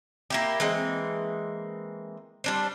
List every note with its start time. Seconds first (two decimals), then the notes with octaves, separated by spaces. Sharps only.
0.30 A#3 E4 G4
0.60 E3 G#3 A#3 C4
2.44 G3 D4 C5